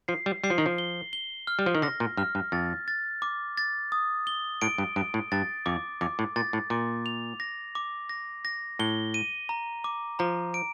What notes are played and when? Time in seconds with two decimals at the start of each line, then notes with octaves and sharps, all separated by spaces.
0.08 F3 C7
0.26 G3
0.44 G3 C7
0.50 F3
0.58 D#3
0.66 F3
0.78 G7
1.13 G7
1.47 F6
1.59 G3
1.66 F3
1.75 D#3
1.82 D3 A#6
2.00 A#2
2.17 G2 F6
2.35 G2
2.52 F2 A6
2.88 A6
3.22 D6
3.58 A6
3.92 D#6
4.27 G7
4.62 A2 D7
4.78 G2
4.96 G2 D7
5.14 A2
5.32 G2 A6
5.66 F2 D6
6.01 F2 D6
6.19 A2
6.36 A#2 A6
6.53 A2
6.70 A#2 D6
7.06 F7
7.40 A#6
7.75 D6
8.09 A#6
8.45 A#6
8.79 A2 G7
9.14 D#7
9.49 A#5
9.84 D6
10.19 F3 A#5
10.54 D7